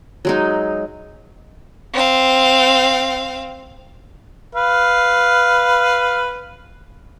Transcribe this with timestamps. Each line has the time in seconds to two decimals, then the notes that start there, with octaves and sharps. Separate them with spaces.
0.25 F#3 G#3 D#4
1.94 C4 F5
4.55 B4 F5